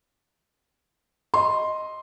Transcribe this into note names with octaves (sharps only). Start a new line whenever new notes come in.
D#5 C6